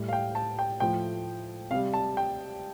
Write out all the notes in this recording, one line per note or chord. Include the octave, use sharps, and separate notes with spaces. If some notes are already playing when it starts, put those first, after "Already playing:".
Already playing: A2 G3
F5
G5
A5
G5
A2 F3 A3 G5
C3 G3 F5
A5
G5